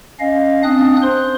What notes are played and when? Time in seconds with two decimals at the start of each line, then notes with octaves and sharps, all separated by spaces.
0.20 C#4 D#5 F5
0.63 C4 D4 D#6 F#6
1.02 C5 C6